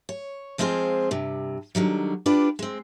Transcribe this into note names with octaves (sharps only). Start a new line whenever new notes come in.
C#5
F3 G#3 C4 F4 G#4 C5
G2 C3
D3 D#3 F#3 G3
D4 F4 G4 B4 D5
G#3 C4